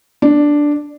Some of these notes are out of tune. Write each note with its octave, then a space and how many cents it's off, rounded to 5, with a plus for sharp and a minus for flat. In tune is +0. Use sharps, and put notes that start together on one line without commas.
D4 +0